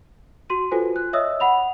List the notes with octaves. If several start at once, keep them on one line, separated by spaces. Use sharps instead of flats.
F#4 C6 D#7
F4 F#4 A4 B4 C5 G#5
F#6
C#5 D#5 E5 D#6 E6
F#5 B5 F7